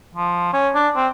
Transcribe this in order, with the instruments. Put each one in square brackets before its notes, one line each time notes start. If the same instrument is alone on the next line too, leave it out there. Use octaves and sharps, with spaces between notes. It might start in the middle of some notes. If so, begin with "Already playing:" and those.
[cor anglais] F3
C#4
D4
C4